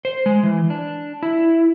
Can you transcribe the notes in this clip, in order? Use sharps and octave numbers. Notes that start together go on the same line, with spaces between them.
C5
G#3
E3
D4
E4